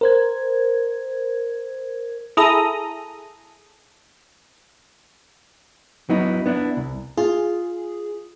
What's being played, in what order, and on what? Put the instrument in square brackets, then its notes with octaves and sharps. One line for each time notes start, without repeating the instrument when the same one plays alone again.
[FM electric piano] A#4 C5 G#6
[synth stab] E4 G#4 A4 A#5 D#6
[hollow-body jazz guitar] F#3 B3 D#4 E4
B3 D4 E4
C2
[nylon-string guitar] F4 [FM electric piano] G#4